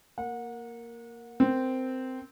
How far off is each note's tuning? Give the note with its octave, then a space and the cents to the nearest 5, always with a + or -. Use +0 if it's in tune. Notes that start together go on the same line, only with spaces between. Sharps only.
A#3 +0 F#5 -30
C4 -10 A#4 +0